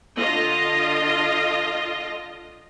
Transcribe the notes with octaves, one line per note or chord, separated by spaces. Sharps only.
D3 F4 D#5